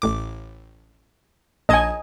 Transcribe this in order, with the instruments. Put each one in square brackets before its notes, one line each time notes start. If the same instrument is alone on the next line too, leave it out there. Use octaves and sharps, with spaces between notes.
[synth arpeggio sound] A1 A2 D6
[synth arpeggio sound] A#1 A5 G#6 [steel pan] D#5 G#5